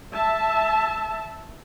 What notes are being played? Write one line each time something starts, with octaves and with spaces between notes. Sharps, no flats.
E5 A5